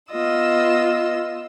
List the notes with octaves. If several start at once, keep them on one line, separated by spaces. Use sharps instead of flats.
B3 F4 D#5 E6